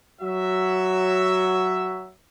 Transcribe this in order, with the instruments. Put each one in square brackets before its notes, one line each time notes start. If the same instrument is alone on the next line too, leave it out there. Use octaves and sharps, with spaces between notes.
[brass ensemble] F#3 F#4 E5